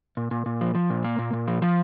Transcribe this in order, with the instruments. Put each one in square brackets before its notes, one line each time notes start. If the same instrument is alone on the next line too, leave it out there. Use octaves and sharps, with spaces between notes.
[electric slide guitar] A#2
A#2
A#2
F3
F3
A#2
A#3
A#2
A#2
F3
F3